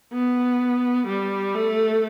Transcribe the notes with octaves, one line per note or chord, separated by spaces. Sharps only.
B3
G3
A3